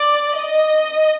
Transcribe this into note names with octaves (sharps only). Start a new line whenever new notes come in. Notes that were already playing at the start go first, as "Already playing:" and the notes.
Already playing: D5
D#5